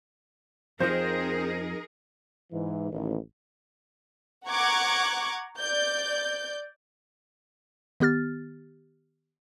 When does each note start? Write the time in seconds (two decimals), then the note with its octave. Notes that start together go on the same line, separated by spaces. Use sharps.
0.80 F2 F3 C4 D#4 G#4 A#4 C5
2.53 G#2 E3
2.91 A1 D#2
4.49 F#5 A#5 C#6 D6 F#6 G#6
5.60 D5 G6
8.00 D#3 B3 G4 F6 A6